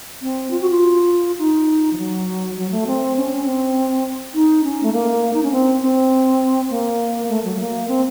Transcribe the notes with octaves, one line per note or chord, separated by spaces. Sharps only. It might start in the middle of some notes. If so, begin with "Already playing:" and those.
C4
F4
F#4
F4
D#4
F3
F#3
F#3
A3
C4
C#4
C#4
C4
D#4
C#4
A3
A#3
D#4
C#4
C4
C4
A#3
A3
F#3
A#3
C4